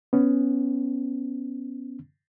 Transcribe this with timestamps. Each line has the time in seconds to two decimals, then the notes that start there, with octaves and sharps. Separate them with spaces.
0.13 B3 C#4